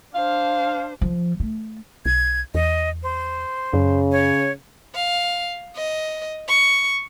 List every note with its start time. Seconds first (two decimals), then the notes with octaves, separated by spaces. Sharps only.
0.15 D4 C5 F5
1.01 F3
1.40 A3
2.06 B1 G#6
2.55 E2 D#5
3.03 C5
3.74 F#2 C#3
4.12 C#5
4.95 F5
5.76 D#5
6.48 C#6